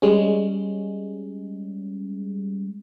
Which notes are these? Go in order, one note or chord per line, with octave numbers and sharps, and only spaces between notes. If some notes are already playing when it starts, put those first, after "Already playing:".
G3 G#3 C#4